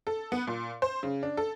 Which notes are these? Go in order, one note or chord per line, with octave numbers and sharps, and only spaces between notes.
A4
B3
A#2
C5
C#3
D4
A4